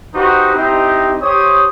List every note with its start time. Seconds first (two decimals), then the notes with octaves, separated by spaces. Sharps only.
0.14 D#4 F#4 G4 B4 C5
0.54 C4 D#4 E4 G4
1.21 G4 C5 C#5 D#6